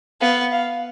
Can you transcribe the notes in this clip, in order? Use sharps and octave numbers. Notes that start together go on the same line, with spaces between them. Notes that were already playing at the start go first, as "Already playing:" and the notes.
B3 F5
F5